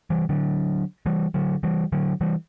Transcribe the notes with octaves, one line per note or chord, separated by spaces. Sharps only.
E3 G3
D3 F#3
E3 G3
D3 F#3
E3 G3
D3 F#3
E3 G3